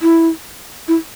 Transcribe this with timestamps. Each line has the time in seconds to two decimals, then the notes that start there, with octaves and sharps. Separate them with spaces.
0.02 E4
0.88 E4